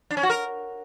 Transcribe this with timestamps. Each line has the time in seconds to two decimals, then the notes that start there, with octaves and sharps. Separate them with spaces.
0.11 D4
0.17 C#4
0.23 F#4
0.30 A#4